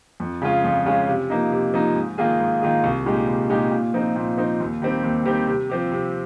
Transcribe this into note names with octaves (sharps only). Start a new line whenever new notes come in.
F2
C#3 G#3 C#4 F4
F2
C#3 G#3 C#4 F4
C3
F3 A#3 D#4
C3
F3 A#3 D#4
G#2
D#3 A#3 F4 G#4
G#2
D#3 A#3 F4 G#4
C2
A#2 G#3 D#4 G4
C2
A#2 G#3 D#4 G4
A#2
F3 C4 D#4
A#2
F3 C4 D#4
D#2
D#3 G3 C4 G4
D#2
D#3 G3 C4 G4
C3
F3 C4 G4
C3